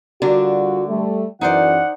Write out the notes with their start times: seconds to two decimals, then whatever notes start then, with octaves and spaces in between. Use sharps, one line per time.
0.22 D3 G3 D4 F4 F#4 A#4
0.88 G3 A3
1.41 F#2 E3 D#4 C5 D5 F#5